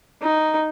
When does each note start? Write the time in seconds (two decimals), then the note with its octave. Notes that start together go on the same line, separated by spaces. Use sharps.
0.22 D#4